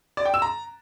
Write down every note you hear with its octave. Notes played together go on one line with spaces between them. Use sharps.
D5
G5
E6
A#5